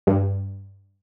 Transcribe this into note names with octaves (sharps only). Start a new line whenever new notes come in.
G2